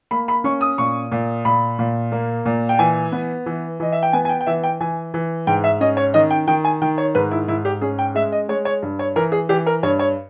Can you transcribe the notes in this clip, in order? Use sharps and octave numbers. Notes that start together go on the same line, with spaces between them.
A#3 B5
B5
C#4 C#6
D#6
A#2 C#6
A#2
A#2 B5
A#2
A#3
A#2
G5
E3 G#5
B3
E3
E3 D#5
E5
G5
B3 G#5
G#5
G5
G5
E3 E5
G5
E3 G#5
E3
G#2 G5
E5
C#4 D#5
C#5
D#3 D#5
G5
D#3 G5
G#5
D#3 G5
C#5
G#2 B4
E4
G#2 E4
G4
C#4 G#4
G5
G#3 E5
D#5
G#3 C#5
C#5
G2
C#5
E3 A#4
G#4
E3 G4
A#4
G2 C#5
C#5